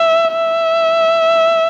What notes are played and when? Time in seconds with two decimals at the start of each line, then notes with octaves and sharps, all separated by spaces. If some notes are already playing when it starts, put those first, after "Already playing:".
Already playing: E5
0.32 E5